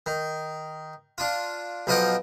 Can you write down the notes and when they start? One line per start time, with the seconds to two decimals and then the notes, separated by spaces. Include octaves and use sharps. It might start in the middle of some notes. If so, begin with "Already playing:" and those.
0.06 D#3
1.18 D4 F4
1.87 B1 F3 F4 D#5 F#5 G5